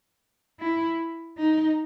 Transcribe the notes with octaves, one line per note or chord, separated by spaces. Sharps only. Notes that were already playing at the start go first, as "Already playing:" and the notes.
E4
D#4